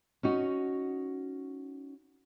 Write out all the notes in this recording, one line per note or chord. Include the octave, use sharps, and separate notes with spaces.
C#4 D#4 F#4